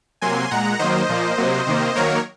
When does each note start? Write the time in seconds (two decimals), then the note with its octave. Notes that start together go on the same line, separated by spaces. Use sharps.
0.21 C3 F#3 A#3 G#5 C6
0.51 A#2 G#3 F#5 A#5
0.79 D#3 F#3 A#3 C5 D#5
1.09 A#2 F3 A#3
1.38 C3 F#3 A#3
1.67 C3 D#3 A#3
1.95 D#3 F#3 A#3 A#4 C#5